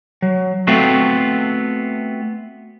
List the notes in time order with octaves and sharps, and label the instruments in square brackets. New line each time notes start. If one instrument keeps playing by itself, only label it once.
[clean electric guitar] F#3
A3 B3 C4 F4 F#4 A4